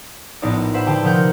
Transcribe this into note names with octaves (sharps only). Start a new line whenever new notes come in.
A#1 A2 B3 D#4 D5
B4 C5 E5 F#5
D3 G4 G5 A5
C3 F3 D#4 A#4 F#5 G6